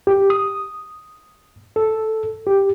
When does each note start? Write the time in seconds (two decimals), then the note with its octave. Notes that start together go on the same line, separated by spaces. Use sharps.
0.07 G4
0.30 D#6
1.76 A4
2.47 G4